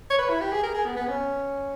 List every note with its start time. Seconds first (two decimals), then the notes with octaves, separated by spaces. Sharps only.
0.10 C#5
0.18 B4
0.30 E4
0.41 G4
0.52 G#4
0.63 A#4
0.74 G#4
0.86 B3
0.97 B3
1.08 C#4